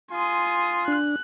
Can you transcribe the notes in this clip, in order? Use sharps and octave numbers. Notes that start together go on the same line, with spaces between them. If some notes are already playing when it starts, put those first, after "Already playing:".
F4 G#5 C6 D#6
D4 F#6